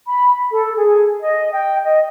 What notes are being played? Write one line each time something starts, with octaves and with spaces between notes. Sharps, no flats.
B5
A4
G#4
D#5
G5
D#5